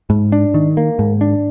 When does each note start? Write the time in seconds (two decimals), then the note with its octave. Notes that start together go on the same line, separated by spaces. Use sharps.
0.10 G#2
0.32 D4
0.54 D#3
0.77 A#3
0.99 G#2
1.21 D4